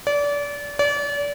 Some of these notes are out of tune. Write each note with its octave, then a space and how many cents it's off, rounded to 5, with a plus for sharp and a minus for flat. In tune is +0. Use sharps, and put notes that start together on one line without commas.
D5 -30
D5 -35